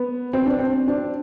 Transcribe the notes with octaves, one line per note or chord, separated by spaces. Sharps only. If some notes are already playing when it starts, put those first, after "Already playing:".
Already playing: B3
C4
D4
C4
D4